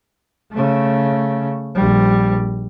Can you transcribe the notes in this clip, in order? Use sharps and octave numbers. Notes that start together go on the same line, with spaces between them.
C#3 A3
A#1 G3